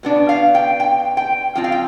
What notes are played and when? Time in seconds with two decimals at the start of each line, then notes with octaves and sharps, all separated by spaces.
0.03 B2 B3 D4
0.29 F5
0.55 G5
0.80 G5
1.17 G5
1.55 F3 C4 F4 G5
1.64 F5
1.72 G5